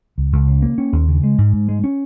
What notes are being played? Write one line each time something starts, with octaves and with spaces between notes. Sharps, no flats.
C#2
C#2
C#3
A#3
C#4
D#2
C#3
G#3
G#2
G#2
G#3
C#4